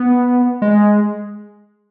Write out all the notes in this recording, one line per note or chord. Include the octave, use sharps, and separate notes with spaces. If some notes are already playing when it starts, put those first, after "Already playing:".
Already playing: B3
G#3